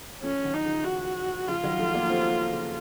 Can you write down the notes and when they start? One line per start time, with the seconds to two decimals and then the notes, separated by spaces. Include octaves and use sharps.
0.23 F3 A3 C#4
0.44 D#3 F#3
0.54 D#4
0.64 C#3 F3
0.85 F#4
1.47 C#3 F3 F4
1.64 D#3 F#3
1.79 F3 A3
1.94 F#3 A#3
2.10 A3 C4
2.31 A3 C4
2.52 C#3